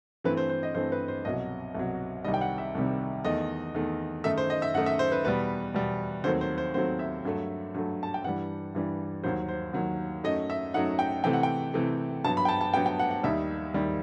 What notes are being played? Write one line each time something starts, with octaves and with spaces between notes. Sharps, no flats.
G2 E3 A3 C4 B4
C5
C5
D#5
G2 E3 A3 C4 C5
B4
C5
C2 B2 F#3 D#5
C2 B2 F#3
C2 C3 D#3 G3 D#5
G5
F#5
E5
C2 C3 D#3 G3
E2 D#3 A3 D#5
E2 D#3 A3
F#2 D#3 A3 D#4 E5
C5
D#5
E5
F#2 D#3 A3 D#4 F#5
E5
C5
B4
E2 B2 G3 B4
E2 B2 G3
D#2 D#3 F#3 A3 C4 C5
C5
C5
D#2 D#3 F#3 A3 C4 C5
E5
G2 F#3 A3
G2 F#3 A3
A5
G5
G2 E3 G3 F#5
G2 E3 G3
D#2 D#3 F#3 C5
C5
D#2 D#3 F#3
F#2 F#3 A3 D#4 D#5
E5
F#2 F#3 A3 D#4 F#5
G5
C3 E3 A3 G5
F#5
G5
C3 E3 A3
G2 F#3 B3 A5
B5
G5
A5
A5
G2 F#3 B3 G5
G5
F#5
F#5
D#2 D#3 G3 D#4 E5
D#2 D#3 G3 D#4